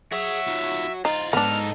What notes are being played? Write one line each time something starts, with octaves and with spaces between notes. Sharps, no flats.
F#4 G#4 C#5 E5
D#4 F4
D#4 F4 C5 D#5
C#2 G#2 B3 D4 D#4 A4 F6